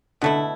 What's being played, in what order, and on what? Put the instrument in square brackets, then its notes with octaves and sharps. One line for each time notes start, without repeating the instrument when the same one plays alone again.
[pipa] B2 A3 E4 [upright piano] D3